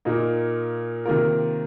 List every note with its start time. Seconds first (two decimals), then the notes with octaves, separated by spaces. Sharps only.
0.05 A#2 A#3 D#4
1.06 C3 D#3 A#3 F4 A#4